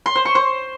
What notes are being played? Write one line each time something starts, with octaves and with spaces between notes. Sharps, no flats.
C6
C5
C#6
C5